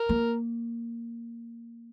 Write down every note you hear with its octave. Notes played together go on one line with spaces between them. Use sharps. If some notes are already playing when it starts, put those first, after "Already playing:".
Already playing: A#4
A#3